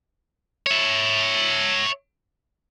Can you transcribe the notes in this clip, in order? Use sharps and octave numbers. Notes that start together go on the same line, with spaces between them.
C#5 E5